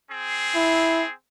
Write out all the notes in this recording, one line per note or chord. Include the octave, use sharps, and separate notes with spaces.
C4 G#4
E4